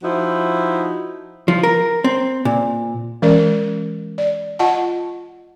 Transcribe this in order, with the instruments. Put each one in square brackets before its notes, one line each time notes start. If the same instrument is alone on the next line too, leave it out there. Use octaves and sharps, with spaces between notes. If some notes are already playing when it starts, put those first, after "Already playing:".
[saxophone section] F3 D#4 E4 F#4
[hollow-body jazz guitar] F3
A#4
C4
A#2
[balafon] E3 G#3 C#4 A#4 D5
D5
F4 D#5 F#5 A5